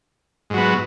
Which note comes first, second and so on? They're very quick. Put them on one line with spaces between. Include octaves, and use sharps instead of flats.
G#2 F#3 B3